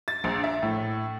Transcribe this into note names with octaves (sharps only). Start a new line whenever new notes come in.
A6
A#1
E5
A2